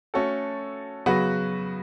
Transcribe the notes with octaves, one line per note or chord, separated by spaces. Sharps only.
A3 C#4 F#4 A4
C#3 F#3 B3 F#4 B4